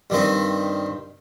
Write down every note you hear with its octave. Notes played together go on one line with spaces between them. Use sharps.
G2 D#3 C4 D#4